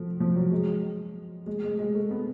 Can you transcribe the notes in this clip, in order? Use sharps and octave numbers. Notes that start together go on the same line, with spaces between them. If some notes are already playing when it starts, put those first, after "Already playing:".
Already playing: F3 A3
F3
F#3
G#3
G#3
G#3
G#3
A3
B3